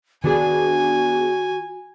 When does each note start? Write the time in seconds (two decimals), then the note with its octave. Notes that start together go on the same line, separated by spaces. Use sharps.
0.24 D#3 B3 D4 F#4 G#4 G#5